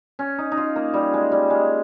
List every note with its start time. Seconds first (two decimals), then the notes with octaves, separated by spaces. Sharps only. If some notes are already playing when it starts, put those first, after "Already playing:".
0.19 C#4
0.38 D#4
0.52 D#4
0.57 F4
0.76 A#3
0.94 G3
1.14 G#3
1.32 G3
1.50 G#3